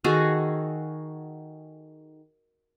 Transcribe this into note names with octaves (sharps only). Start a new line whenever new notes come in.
D#3 F#4 G#4 A4